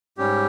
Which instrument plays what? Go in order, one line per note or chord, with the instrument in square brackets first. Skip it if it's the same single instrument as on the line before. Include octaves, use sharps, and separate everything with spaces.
[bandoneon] G#2 G3 C#4 G4